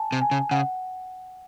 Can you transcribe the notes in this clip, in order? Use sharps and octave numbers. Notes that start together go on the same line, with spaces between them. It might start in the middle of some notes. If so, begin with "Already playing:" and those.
Already playing: G#5 A5
C3
G#5
C#3
C#3 F#5